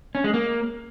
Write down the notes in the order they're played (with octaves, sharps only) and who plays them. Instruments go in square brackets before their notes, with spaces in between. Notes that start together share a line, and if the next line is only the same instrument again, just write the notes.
[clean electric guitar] C#4
G#3
A#3